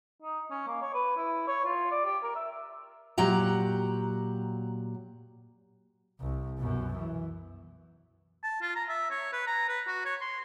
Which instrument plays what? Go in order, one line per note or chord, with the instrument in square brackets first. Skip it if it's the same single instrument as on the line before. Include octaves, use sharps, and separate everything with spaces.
[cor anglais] D#4
C#4
A#3
C#5
B4
E4
C#5
F4
D5
G4
A#4
E5
[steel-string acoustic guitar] A#2 F#3 G4 F#5 A#5
[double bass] C2
F#2 B2
E3
[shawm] A5
F4
A#5
E5
C#5
B4
A#5
B4
F#4
C#5
C6